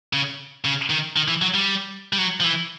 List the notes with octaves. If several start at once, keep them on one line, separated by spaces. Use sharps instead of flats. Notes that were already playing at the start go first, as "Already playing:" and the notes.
C#3
C#3
D#3
D#3
E3
F#3
G3
G3
F#3
F3
E3